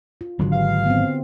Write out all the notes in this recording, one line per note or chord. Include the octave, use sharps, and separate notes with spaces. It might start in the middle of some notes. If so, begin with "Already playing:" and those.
F4
G#1 D3 F#3 G#3 F#4
G4 B4 F5
B3 C4